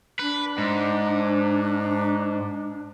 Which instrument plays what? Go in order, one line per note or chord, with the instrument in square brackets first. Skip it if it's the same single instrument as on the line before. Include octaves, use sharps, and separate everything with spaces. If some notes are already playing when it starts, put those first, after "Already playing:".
[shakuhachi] D4 [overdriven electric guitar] B4
[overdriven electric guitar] G#2